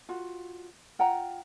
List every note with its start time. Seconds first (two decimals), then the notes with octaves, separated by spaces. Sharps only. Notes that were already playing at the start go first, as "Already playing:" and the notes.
0.09 F4 F#4
0.99 F4 F#5 G5 A#5